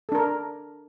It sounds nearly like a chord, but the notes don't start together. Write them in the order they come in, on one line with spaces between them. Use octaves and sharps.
A4 D4 A#4